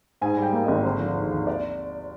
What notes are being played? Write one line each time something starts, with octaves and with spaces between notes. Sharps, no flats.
G#2 G#5
G3
G5
A#3
G#1 D#5
D3 C5
F3
D#2
D#2
D5